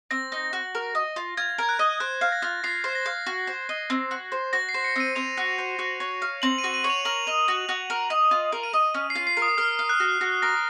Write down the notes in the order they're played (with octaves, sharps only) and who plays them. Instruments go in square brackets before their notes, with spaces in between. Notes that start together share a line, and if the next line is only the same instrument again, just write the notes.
[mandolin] C4 [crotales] A#6
[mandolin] D#4
F#4
A#4
D#5
F4
[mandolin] F4 [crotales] G#6
[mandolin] A#4 [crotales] G#6
[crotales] F#6
[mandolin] D#5
[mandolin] C5 [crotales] F#6
[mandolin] F5
[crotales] A#6
[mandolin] F4
[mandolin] F4 [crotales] C7
[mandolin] C5
[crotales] A#6
[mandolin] F5
F#4
C5
D#5
C4
F#4
C5
[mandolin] F#4 [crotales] A#6
[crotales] C7
[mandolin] C5
[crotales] C#7
[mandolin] C4 [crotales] D#7
[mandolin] C4 [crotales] F7
[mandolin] F#4
C5
F#4
C#5
F5
[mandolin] C4 [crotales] F#7
[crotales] D#7
[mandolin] F#4
[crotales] D#7
[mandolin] C#5
[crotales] F7
[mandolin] A#4 [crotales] F#7
[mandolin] D#5
F#4
F#4
A#4
D#5
F4
A#4
[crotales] D#7
[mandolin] D#5
C#4
[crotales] C7
[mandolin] F4
[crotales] C7
[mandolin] A#4
[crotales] D#6
[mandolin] A#4 [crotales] F6
[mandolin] F5
[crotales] F#6
[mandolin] F#4
F#4
[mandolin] A#4 [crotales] A#6